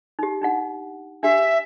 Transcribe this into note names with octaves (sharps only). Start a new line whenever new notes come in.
D#4 G4
D4 D#4 F#5
D4 G4 E5